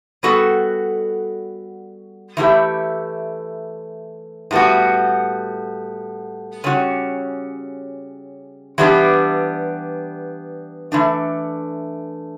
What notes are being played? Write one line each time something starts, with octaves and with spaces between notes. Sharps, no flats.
G3 B3 F#4 A4
E3 A3 E4 G4
A2 G3 B3 F#4
C#3 G3 C#4 F#4
E3 G3 B3 D4 G4
E3 A3 D4